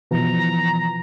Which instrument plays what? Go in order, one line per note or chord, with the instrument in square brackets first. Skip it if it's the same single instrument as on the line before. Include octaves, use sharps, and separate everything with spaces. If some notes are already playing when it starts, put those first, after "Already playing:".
[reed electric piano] B2 E3 F3 [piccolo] A#5